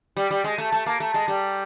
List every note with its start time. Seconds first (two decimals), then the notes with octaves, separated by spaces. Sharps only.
0.17 G3
0.31 G3
0.44 G#3
0.58 A3
0.72 A3
0.86 A#3
1.00 A3
1.14 G#3
1.28 G3